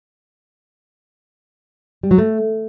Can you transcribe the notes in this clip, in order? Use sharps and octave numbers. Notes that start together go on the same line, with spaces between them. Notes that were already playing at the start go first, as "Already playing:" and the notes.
G3
F#3
A3